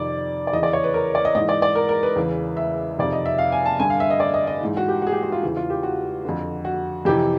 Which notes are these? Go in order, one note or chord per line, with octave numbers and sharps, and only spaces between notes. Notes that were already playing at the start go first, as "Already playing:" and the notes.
Already playing: F2 C3 D#3 D5
D5
E2 C#3 E3 D#5
D5
C#5
B4
A#4
D5
D#5
G#2 E3 D#5
D5
D5
A#4
A#4
B4
E2 C#3 E3
E5
F2 C3 D#3 D5
D#5
E5
F5
G#5
A5
G2 D3 G#5
F5
E5
D#5
D5
D#5
D#5
G#2 E3
F#4
G4
F#4 G#4
G4
F#4
F4
E2 C#3 E3
F4
G4
F#4
F2 D3
F#4
F2 C3 E3 G4